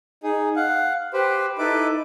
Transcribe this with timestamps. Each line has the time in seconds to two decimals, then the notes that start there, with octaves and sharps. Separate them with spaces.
0.23 D#4 G#4
0.56 F5 F#5
1.13 G4 B4 C5
1.58 D#4 E4 A4 B4 D6